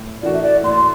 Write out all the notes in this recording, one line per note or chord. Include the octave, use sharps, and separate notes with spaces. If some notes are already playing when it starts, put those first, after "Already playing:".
Already playing: A2
E3 A3 D4 F#4 D5
E5
D5
A2 C6